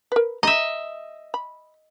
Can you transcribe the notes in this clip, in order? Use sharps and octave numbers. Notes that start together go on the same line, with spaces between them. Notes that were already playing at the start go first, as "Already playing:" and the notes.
A#4 B4
D#5 E5 A#5
B5